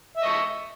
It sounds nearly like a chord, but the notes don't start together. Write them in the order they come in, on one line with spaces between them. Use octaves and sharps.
E5 D#5 C#6